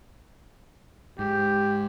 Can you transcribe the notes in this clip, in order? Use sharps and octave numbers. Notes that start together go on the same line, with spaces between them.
G#2 G4